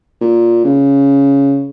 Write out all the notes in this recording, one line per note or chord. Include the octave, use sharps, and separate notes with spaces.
A#2
C#3